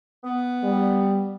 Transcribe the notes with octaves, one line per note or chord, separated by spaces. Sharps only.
B3
G3